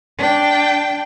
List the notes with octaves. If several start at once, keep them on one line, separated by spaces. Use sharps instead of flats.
D4 G5